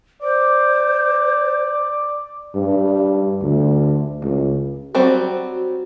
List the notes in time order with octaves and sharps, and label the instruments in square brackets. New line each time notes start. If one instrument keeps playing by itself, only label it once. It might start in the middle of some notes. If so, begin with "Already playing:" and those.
[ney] C5 [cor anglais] D5
[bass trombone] G2
D2
C#2
[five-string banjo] F#3 G3 C4 [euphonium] F#4